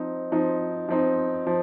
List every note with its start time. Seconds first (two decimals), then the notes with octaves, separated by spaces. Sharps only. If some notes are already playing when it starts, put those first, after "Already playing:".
Already playing: F3 C4 D#4
0.32 F3 C4 D#4
0.89 F3 C4 D#4
1.47 F3